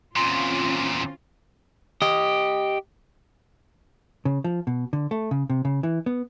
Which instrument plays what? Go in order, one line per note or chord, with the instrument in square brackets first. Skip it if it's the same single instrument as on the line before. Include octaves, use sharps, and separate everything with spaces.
[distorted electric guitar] E2 A#2 [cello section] C4 C#4 F4 [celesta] C6
[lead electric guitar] G4 D#5
[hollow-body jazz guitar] C#3
F3
B2
D3
A3
C#3
C3
C#3
E3
B3